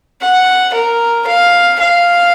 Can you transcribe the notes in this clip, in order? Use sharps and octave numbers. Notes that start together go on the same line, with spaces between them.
F#5
A#4
F5
F5